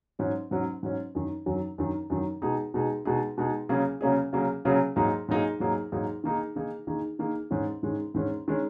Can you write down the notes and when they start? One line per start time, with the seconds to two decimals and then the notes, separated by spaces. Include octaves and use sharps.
0.19 G#2 F#3 C#4
0.51 G#2 F#3 C#4
0.83 G#2 F#3 C#4
1.15 F#2 D#3 F#3
1.46 F#2 D#3 F#3
1.78 F#2 D#3 F#3
2.10 F#2 D#3 F#3
2.42 B2 G#3 D#4 G#4
2.74 B2 G#3 D#4 G#4
3.05 B2 G#3 D#4 G#4
3.38 B2 G#3 D#4 G#4
3.69 C#3 F#3 A#3 C#4 G#4
4.01 C#3 F#3 A#3 C#4 G#4
4.33 C#3 F#3 A#3 C#4 G#4
4.65 C#3 F#3 A#3 C#4 G#4
4.96 G#2 F#3 A#3 D#4 G#4
5.28 G#2 F#3 A#3 D#4 G#4
5.60 G#2 F#3 A#3 D#4 G#4
5.92 G#2 F#3 A#3 D#4 G#4
6.24 D#3 A#3 D#4 G#4
6.56 D#3 A#3 D#4 G#4
6.87 D#3 A#3 D#4 G#4
7.19 D#3 A#3 D#4 G#4
7.51 G#2 D#3 G#3 C#4
7.83 G#2 D#3 G#3 C#4
8.14 G#2 D#3 G#3 C#4
8.48 D#3 G#3 C#4